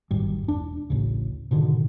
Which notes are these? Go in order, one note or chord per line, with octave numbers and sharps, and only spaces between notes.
D1 G#1 G2
E1 D4
A1 D2 C#3
G#2 B2 D3 D#3